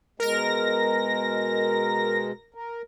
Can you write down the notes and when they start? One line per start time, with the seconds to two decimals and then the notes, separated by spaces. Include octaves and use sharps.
0.20 B2 G#3 A#4 A#6
2.54 A#4